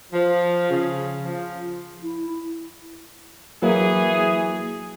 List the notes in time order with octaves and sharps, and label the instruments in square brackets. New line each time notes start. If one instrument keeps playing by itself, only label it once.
[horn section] F3
C#3
F3
[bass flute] E4
[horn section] E3 G#4 [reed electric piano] F#3 A#3